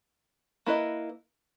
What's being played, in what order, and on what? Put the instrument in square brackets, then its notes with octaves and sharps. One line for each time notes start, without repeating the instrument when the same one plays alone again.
[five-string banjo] A#3 E4 B4 D#5